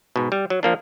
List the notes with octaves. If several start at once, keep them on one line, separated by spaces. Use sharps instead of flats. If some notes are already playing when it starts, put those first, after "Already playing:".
G#2 B2
G3
F#3
F3 A#3 D4